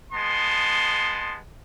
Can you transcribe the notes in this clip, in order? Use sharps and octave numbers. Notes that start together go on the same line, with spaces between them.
G#3 B3 A5 C6